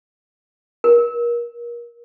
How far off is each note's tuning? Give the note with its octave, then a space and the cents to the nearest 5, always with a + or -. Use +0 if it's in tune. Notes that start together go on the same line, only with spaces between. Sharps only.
A#4 +25